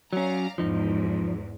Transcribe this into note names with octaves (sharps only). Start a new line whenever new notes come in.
F#3 C#4 D5 F5 A#5
E2 G#2 F3 D#4